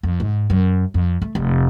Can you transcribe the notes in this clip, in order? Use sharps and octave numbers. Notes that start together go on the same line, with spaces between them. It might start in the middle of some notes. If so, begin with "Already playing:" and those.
F2
G#2
F#2
F2
A3
F1